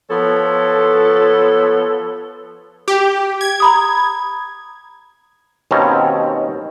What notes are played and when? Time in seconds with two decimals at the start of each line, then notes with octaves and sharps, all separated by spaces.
0.10 F3 B3 A4 C#5
2.88 G4
3.41 G#6
3.60 A#5 B5 D#6
5.71 D#2 B2 C4 C#4 A5 A#5